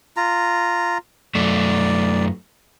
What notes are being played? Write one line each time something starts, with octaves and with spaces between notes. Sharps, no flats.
F4 A#5
F#2 A3 D5